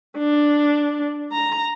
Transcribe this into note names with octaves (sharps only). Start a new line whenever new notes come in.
D4
A#5